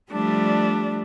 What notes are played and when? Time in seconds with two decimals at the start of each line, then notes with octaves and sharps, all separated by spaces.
0.12 F3 G3 A3 D4